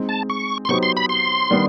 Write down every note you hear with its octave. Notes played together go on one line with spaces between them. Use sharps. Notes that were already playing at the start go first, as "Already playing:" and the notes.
Already playing: G#3 C4 D#4
A5
C#6
C6
F#3 B3 D#4 G4 C5 C#6
C6
B5
C6
D#3 G3 B3 D4